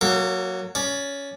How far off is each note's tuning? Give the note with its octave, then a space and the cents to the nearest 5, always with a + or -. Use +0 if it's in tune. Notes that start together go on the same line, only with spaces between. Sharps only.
F#3 +0 A#3 +0 A#4 -45
C#4 +15 D5 +0